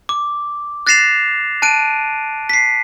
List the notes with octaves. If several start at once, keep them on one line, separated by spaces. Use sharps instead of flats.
D6
F#6 A6 A#6 C7 E7 F7
A5 F#6 D7 D#7
B6 C7